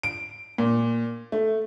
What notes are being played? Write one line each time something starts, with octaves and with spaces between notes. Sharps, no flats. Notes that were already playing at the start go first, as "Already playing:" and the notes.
D7
A#2
A3